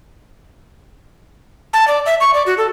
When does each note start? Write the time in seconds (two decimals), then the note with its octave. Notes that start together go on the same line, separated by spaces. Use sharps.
1.73 A5
1.88 D5
2.06 E5
2.21 C#6
2.34 D5
2.46 F#4
2.58 A4